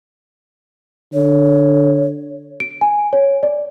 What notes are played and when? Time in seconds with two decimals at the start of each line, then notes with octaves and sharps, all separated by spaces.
1.14 D3 C#5
2.60 D7
2.81 G#5
3.13 C#5
3.43 D5